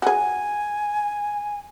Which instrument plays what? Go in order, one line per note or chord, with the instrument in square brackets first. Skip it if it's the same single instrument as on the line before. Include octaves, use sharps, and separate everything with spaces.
[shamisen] F#4 G#4 [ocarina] G#5